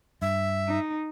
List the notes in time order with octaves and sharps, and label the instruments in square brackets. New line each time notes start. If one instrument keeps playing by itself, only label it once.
[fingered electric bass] G2 [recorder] E5
[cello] D#4